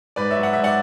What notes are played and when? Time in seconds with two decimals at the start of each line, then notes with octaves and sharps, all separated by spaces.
0.16 G#2 B4 D5
0.31 C#5 E5
0.37 F#3
0.43 F#5
0.53 G#2 E5
0.64 D5 F#5